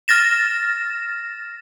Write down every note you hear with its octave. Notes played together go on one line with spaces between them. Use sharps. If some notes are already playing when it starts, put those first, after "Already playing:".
F6 A6 A#6 E7